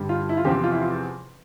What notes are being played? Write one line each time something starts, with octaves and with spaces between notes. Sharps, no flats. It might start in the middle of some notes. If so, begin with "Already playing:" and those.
Already playing: G2 D3 G3
F4
E4
F4
E2 C3 F3 C4 G4
F4
E4
F4